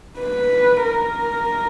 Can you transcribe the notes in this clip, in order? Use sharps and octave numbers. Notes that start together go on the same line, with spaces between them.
B4
A#4